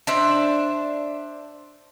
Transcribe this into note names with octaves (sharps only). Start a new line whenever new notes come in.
D4 C5 E5